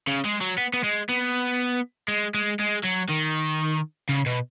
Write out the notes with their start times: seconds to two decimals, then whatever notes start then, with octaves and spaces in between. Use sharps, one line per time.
0.08 C#3
0.25 G#3
0.41 F#3
0.58 B3
0.73 B3
0.84 G#3
1.09 B3
2.08 G#3
2.34 G#3
2.59 G#3
2.83 F#3
3.09 D#3
4.09 C#3
4.26 B2